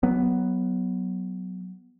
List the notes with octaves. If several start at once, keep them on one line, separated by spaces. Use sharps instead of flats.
F#3 B3